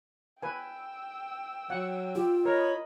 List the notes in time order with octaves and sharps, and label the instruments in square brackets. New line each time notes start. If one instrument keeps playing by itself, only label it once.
[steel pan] B4 G#5 [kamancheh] G5 E6
[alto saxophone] F#3 [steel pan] F#5
[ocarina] F4 [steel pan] G4
[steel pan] A#4 [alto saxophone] C#5 [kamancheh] D#5 B5